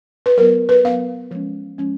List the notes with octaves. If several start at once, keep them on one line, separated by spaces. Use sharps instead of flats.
B4
F#3 B3 A#4
B4
F#3 B3 F5
F3 G#3 C#4
F3 G#3 C#4